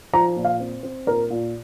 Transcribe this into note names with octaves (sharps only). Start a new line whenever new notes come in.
F3 A#5
A#2
F5
C4
C4
A#2 A#4
A#2